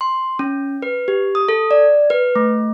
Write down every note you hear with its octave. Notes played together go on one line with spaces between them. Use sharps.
C6
C#4
B4
G4
D#6
A4
D5
B4
A3